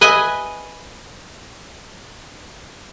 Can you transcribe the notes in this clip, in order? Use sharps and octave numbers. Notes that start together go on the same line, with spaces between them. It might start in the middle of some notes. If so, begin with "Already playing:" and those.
B4 D#5 E5 G#5